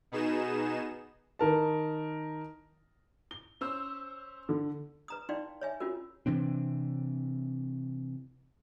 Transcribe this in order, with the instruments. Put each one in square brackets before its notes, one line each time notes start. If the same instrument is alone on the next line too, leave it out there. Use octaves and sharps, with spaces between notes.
[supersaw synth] B2 B3 D#4 G#4 E7
[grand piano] D#3 A#4 A5
[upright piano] G7
[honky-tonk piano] C#4 C5 E6
[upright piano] D3
[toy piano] B4 A#5 D#6
D#4 E4 D5 F5 G5 C6
C#5 E5 G#5
C#4 F4 F#4 A#4
[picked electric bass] C3 E3 C4 D4